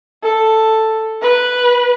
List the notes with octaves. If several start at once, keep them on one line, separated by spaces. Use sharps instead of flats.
A4
B4